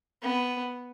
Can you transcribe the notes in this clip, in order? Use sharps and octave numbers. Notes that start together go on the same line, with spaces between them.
B3